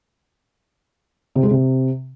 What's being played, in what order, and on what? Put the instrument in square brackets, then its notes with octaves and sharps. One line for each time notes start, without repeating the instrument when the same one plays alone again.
[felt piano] C3
G#3
C3